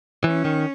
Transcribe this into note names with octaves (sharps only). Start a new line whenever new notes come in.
E3 C#4
D#3